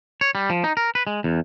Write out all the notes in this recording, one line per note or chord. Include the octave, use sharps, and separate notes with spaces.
C#5
G3
F3
D#4
A#4
B4
G#3
E2